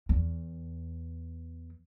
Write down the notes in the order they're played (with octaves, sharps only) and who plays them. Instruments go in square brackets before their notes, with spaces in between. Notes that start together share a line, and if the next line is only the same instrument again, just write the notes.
[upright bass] E2